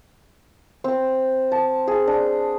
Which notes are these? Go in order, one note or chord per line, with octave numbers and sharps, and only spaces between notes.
C4
A5
G#4
D4